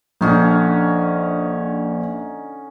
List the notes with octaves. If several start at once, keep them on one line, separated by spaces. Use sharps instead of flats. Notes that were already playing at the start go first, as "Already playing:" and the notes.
A#1 D3 C#4 D#4